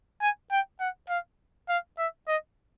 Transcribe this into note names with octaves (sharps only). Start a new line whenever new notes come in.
G#5
G5
F#5
F5
F5
E5
D#5